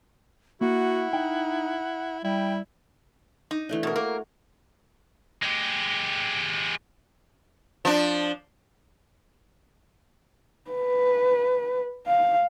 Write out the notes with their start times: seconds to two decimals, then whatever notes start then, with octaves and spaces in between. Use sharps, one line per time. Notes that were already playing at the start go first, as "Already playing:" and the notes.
0.61 A#3 E4 F#4 F#5
1.13 D#4 G5
2.24 G3 E4 G5
3.51 D#4
3.69 E3 A3 D4
3.83 B2 F#4 A#4 C#5
3.96 A#3 A#4
5.42 G#3 G4
7.85 F3 D4
10.71 B4
12.07 F5